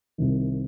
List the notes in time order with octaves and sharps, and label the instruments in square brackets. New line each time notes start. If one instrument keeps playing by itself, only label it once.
[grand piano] C2 C3 D#3